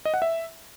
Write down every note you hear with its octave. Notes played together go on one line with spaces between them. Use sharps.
D#5
F#5
E5